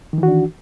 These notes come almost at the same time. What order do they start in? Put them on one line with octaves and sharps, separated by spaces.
D#3 E3 F#4 D4